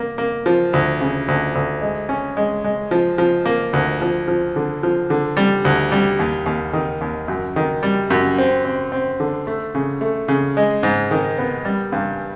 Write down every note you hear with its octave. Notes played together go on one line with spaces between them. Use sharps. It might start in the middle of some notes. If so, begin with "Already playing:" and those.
Already playing: A#3
A#3
F3
D2
C#3
D2
D2
G#3
C#4
G#3
G#3
F3
F3
A#3
D2
F3
F3
D3
F3
D3
G3
D2
G3
D#2
D#2
D#3
D#2
F#2
D#3
G3
F#2
C4
C4
C4
D3
A3
C#3
A3
C#3
G#3
G#2
D#3
B3
G3
G2